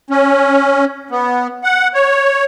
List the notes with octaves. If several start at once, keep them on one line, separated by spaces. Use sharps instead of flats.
C#4
B3
F#5
C#5